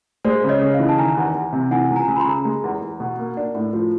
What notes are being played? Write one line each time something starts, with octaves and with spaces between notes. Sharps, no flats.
G#3 C5 D5
C#3
C#5 D#5
C#3
D#5 F5
E3
A5
D#3 G#5 A#5
E2
E2
C3
E3 F#5 G#5
C#2
G#5 A#5
C#2
B5
A#5 C6
C#3
G#3
E2
E2
B2
A#3
D4
A2
F3